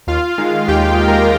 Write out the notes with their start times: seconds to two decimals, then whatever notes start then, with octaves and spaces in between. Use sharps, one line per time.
0.07 D#2 F4 F5
0.38 D#3 G#3
0.68 D#2 G4 G5
0.98 D#3 G#3
1.08 A#4 A#5